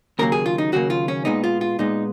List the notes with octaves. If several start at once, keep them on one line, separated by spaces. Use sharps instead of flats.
D#2 C#3 F#3 A#3 A#4
G#4
F4
D#4
D#2 C#3 F#3 A#3 F#4
F4
C#4
A#2 G#3 B3 D#4
F4
F4
A#2 G#3 B3 D#4